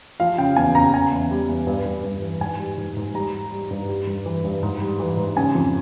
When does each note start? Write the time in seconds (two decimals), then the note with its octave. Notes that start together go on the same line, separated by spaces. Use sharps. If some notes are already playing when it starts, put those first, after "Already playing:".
0.20 F3 F5
0.38 C#3 G5
0.56 E2 G#5
0.75 C#3 A#5
0.94 C#3 G#5
1.12 E2
1.31 G3
1.49 E2
1.67 G2
1.86 G2
2.04 G2
2.22 E3
2.41 G#2 G#5
2.59 G3
2.78 G#2
2.97 G#2
3.14 G3 A#5
3.33 G3
3.52 G3
3.70 G2
3.88 G3
4.07 G2
4.26 E3
4.44 G2
4.63 G#2
4.81 G3
4.99 E3
5.17 G#2
5.36 C#3 G#5
5.55 F2